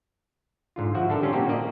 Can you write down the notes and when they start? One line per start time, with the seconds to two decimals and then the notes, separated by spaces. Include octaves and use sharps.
0.76 G#2 D3 F4
0.95 F3 F#4 E5 F#5
1.09 D3 D4 A4 A#4
1.22 G3 C#4 F4
1.33 A#2 A#3 C4 D#4 F#4 G4
1.49 A#3 D5 D#5